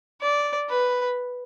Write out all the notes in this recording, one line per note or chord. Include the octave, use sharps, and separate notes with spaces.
D5
B4